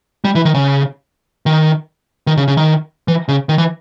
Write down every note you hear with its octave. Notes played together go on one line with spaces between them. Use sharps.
G3
E3
D#3
C#3
D#3
D#3
C#3
C#3
D#3
E3
C#3
D#3
E3